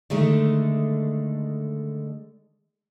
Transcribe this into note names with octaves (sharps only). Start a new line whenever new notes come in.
D3 D#3 G#3 A3